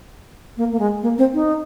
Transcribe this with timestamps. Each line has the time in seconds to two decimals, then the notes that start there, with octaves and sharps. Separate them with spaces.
0.57 A#3
0.72 A#3
0.79 G#3
1.03 A#3
1.18 C4
1.34 D#4